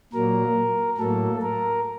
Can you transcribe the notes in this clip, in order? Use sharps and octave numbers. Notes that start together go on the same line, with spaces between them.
A#2 F#3 A#3 A#4
A2 F#3 A#3 A4
A#4